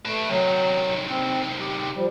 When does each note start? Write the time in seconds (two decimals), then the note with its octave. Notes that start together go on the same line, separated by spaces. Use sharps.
0.06 A3 B4 A5
0.29 C3 D#3 F#3
1.09 C4
1.60 G4
1.96 F3 G3